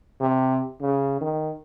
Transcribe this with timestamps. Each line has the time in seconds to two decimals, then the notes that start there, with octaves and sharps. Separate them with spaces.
0.21 C3
0.81 C#3
1.21 D#3